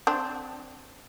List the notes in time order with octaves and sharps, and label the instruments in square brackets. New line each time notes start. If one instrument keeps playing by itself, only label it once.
[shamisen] C4 D4